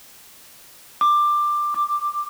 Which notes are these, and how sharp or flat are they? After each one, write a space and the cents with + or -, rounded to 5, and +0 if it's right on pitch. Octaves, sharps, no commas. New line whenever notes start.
D6 +15
D6 +5